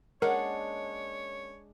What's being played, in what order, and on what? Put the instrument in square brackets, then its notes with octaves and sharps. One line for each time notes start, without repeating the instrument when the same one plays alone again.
[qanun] G#3 D4 [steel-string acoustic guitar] A#3 C#4 F#5 [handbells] A#4 [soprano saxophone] C#5